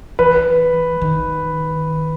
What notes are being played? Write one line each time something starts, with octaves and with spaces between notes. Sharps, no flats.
E3 B4
D#3